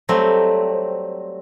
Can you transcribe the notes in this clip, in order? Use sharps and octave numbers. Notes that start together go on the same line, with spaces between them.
F#3 G3 A3 C4